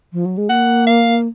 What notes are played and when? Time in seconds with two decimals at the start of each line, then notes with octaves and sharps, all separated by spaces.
0.13 F3
0.25 F#3
0.38 G#3
0.49 A#3 F#5
0.87 F5